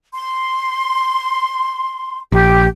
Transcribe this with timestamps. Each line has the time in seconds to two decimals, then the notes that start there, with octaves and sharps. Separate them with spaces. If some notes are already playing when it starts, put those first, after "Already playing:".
0.14 C6
2.32 A#1 G4